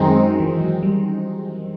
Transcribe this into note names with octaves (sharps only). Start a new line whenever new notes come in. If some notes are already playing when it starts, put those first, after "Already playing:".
Already playing: F#2 D#3 F#3 G#3 C4 D#4
E3
F#3
G3